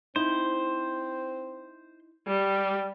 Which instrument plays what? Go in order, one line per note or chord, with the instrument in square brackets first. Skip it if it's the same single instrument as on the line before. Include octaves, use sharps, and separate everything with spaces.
[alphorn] C4 [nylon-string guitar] D#4 E4 [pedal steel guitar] C5
[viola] G3 [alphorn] G4